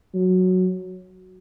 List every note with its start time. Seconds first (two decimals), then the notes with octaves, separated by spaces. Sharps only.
0.14 F#3